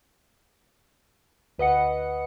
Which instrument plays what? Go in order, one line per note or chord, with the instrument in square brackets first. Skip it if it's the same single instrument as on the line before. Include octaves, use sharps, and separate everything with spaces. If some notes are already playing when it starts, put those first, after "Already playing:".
[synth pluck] D2 B4 D#5 F#5 C#7